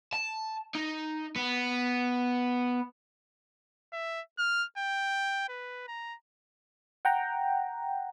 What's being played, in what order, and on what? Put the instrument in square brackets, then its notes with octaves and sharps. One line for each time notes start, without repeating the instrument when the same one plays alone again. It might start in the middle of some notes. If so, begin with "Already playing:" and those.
[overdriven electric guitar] A5
D#4
B3
[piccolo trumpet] E5
F6
G5
B4
A#5
[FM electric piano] F#5 G5 A#5